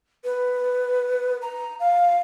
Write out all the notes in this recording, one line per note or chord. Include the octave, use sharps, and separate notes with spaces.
B4
A#5
F5